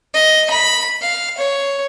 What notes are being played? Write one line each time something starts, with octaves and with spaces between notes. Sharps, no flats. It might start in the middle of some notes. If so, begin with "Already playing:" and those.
D#5
B5
F5
C#5